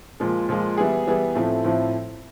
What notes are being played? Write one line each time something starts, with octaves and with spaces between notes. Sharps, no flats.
A#2 F3 G#3
A#2 F3 G#3
E3 G3 B3 E4 G#4
E3 G3 B3 E4 G#4
A2 F3 A3 C4 E4
A2 F3 A3 C4 E4